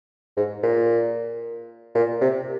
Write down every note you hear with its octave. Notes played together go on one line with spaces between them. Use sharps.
G#2
A#2
A#2
C3